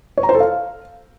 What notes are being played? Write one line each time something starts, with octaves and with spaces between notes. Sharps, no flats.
C#5
A#5
C5
A4
F5